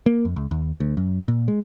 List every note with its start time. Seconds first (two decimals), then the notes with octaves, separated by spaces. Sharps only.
0.06 A#3
0.25 F2
0.36 C#2
0.51 D#2
0.80 D2
0.97 F#2
1.28 A#2
1.48 G#3